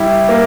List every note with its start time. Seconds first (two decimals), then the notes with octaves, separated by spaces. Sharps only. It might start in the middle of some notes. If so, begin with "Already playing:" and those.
Already playing: G3 E4 G4
0.29 A#3